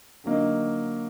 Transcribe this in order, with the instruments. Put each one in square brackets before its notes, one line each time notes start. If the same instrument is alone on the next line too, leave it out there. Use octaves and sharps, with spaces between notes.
[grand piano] D3 F#3 A#3 D#4